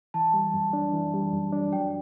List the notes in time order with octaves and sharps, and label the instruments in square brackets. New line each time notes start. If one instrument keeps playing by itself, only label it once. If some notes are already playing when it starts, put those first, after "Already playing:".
[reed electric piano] E3 [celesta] A5
[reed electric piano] G3
F#2
D4
E3
G3
F#2
D4
[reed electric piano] F#3 [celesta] G5